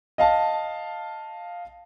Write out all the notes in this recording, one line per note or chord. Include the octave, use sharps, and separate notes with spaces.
D#5 F5 A5